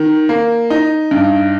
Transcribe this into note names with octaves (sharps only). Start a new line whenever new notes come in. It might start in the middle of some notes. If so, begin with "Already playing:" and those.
Already playing: D#3
A#3
D#4
G2